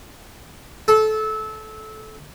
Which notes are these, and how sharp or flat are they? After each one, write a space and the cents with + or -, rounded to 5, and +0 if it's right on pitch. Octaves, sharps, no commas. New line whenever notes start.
A4 -20